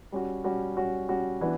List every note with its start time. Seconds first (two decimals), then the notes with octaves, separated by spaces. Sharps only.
0.12 G3 C#4 F#4
0.44 G3 C#4 F#4
0.77 G3 C#4 F#4
1.09 G3 C#4 F#4
1.41 E3 B3 D4 F#4